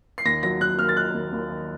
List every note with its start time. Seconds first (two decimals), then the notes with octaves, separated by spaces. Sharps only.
0.18 C7
0.25 D#2 A#6
0.43 F#3 A#6
0.61 F#3 F#6
0.79 D#2 F6
0.89 A6
0.96 D#3 F#6
1.14 D#2
1.32 D#2
1.50 D#3